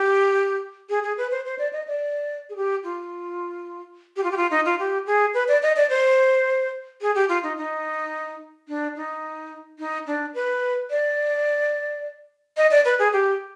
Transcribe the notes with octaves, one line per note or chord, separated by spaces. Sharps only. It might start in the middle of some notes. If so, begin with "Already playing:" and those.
Already playing: G4
G#4
G#4
B4
C5
C5
D5
D#5
D5
G#4
G4
F4
G4
F4
G4
F4
D#4
F4
G4
G#4
B4
D5
D#5
D5
C5
G#4
G4
F4
D#4
D#4
D4
D#4
D#4
D4
B4
D5
D#5
D5
B4
G#4
G4